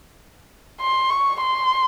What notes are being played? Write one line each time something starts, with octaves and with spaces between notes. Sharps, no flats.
C6
C#6
C6